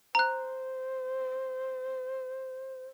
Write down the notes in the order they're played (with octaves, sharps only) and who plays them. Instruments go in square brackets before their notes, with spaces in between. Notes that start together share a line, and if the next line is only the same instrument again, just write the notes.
[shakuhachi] C5 [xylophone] A#5 F#6